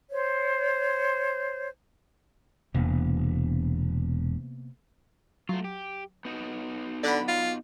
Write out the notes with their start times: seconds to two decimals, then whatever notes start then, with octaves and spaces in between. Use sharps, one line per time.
0.11 C5 C#5
2.74 E1 C3 A#3 B3
5.49 F#3 A3 F4
5.64 G4
6.25 B3 D#4 F#4
7.03 D3 D5 F#5 B5
7.28 F4